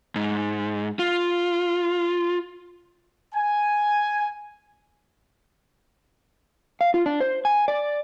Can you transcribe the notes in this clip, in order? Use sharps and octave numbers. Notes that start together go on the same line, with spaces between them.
G#2
F4
G#5
F5
F4
D4
C5
G#5
D5